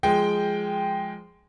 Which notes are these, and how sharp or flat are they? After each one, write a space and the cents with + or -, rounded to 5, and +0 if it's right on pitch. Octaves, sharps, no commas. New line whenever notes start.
F3 +0 G#3 +0 G5 +0